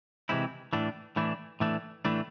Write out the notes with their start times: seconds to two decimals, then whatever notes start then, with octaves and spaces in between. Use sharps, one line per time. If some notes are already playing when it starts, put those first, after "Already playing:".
0.29 C3 E3 G#3 C4 E4
0.73 A2 E3 A3 D4
1.16 A2 E3 A3 D4
1.60 A2 E3 A3 D4
2.05 A2 E3 A3 D4